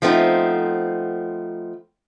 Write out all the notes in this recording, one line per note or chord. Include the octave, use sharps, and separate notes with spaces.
F3 A3 B3 C4 D#4